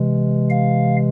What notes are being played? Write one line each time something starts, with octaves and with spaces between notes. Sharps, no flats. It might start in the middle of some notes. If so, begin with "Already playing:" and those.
Already playing: C3 E3 G#3
F5